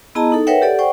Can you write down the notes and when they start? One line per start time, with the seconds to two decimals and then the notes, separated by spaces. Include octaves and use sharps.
0.15 B3 E4 G#4 D#5 A5 A#5
0.32 D#4 A4
0.47 A#4 B4 C#5 E5 F#5 G5
0.62 G4 A4 D5 F#5
0.79 C5 D5 F#5 G5 C#6